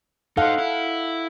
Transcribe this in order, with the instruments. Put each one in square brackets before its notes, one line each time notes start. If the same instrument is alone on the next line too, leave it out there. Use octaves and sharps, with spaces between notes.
[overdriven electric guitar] D#4 C5 [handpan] A4 F5 F#5
[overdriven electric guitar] E4